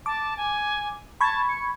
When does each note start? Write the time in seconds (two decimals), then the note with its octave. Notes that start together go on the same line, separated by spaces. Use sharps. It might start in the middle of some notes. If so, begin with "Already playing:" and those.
0.06 A5 D6
0.37 G#5
1.21 A5 B5 C#6 G#6
1.49 C#7